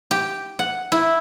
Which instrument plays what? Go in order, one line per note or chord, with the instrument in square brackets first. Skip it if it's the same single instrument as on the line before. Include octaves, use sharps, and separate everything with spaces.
[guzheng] G4
F#5
E4